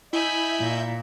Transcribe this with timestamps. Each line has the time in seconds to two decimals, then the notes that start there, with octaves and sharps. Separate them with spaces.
0.13 E4 D#5 E5 G#5 B5 G6
0.60 A#2